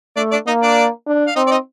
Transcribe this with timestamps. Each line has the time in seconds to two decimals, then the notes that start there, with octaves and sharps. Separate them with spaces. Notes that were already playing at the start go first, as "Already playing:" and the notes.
0.17 A3 D4 D5
0.31 D4 D5
0.47 A#3 D#4 D#5
0.61 D4 D5
1.07 D4
1.27 F5
1.36 C4 D#4 D#5
1.47 D5
1.51 D#4 D#5